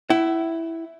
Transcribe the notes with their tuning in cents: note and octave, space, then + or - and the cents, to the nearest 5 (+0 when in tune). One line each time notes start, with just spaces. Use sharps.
E4 +0 F#5 +40